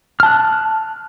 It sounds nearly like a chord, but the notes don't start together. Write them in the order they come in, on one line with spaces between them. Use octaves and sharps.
F6 A5 F#6